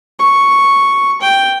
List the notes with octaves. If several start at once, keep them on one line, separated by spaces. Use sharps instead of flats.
C#6
G5